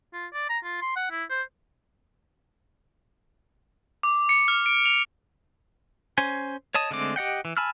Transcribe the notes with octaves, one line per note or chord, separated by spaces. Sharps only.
F4
D5
A#5
F4
C6
F#5
E4
C5
D6
C#7
F6
D7
F7
C#4 C5 G#5
C#5 D#5 A5 D#6
D3 G#3 A3 C4 D6
G4 D#5 F#5 G5
E3
G#5 A5 B5 E6 F6